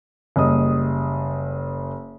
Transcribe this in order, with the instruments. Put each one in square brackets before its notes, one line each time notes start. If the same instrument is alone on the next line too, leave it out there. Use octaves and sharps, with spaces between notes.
[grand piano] F#1 G3 D#5 D#6